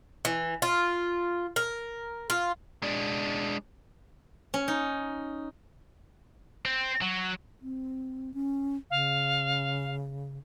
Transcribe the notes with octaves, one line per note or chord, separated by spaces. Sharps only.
E3
F4
A#4
F4
G#3 D4
C#4
D#4
C4
F#3
C4
C#4
C#3 F5